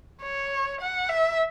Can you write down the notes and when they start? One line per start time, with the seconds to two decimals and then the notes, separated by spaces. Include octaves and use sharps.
0.22 C#5
0.81 F#5
1.10 E5